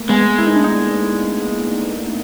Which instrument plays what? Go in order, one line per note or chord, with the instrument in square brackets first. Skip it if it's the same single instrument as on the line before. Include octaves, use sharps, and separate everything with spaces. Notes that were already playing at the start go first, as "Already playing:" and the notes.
Already playing: [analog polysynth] A3 A#3
[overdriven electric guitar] G#3 [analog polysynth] B3
[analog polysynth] E4
D#4
D4
D#4